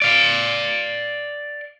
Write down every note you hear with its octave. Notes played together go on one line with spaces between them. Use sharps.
D5 F5